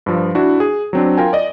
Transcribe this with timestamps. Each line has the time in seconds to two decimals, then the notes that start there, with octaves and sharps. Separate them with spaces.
0.06 G2 F3
0.35 D4 E4 F#4
0.60 G#4
0.93 F#3 C4 D4
1.17 F4 A#4 G5 G#5
1.33 D5 D#5